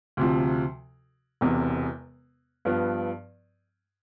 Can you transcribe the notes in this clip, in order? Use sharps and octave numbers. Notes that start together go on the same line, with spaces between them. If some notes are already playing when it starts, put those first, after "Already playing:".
D2 C3 F3
E1 E2 C3
G2 F3 B3